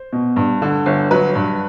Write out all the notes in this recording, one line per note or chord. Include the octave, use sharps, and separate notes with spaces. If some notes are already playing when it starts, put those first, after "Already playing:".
Already playing: C5
B2
G2
D3
G1
F#3 B4
G2